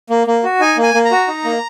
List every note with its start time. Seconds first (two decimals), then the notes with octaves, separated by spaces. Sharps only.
0.10 A#3
0.27 A#3
0.44 F#4
0.60 D#4 G#5
0.77 A#3
0.83 G#5
0.94 A#3
1.05 A#5
1.11 F#4
1.28 D#4
1.44 A#3